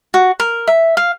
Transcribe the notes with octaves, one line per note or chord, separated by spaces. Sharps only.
F#4
A#4
E5
F5